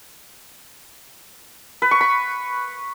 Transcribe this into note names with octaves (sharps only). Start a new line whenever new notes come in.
B4
C#6
B5